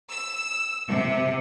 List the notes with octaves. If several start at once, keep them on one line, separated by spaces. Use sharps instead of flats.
E6
C3